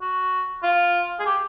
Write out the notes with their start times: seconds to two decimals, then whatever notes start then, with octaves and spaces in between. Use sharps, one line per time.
0.01 F#4
0.63 F4
1.19 G#4
1.26 G4